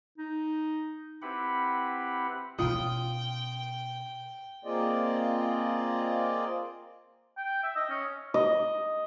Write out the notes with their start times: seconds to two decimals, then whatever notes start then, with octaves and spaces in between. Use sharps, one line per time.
0.18 D#4
1.22 C4 E4 G4 B4 F#5 B5
2.59 B2 C#4 F4 G5 D#6
4.65 A#3 C4 F4 G#4 D5 D#5
7.38 G5
7.63 E5
7.76 D#5
7.89 C#4
8.34 D#5